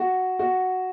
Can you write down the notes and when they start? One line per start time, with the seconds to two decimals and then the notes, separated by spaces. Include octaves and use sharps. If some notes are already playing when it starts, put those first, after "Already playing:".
Already playing: F#4
0.39 F#4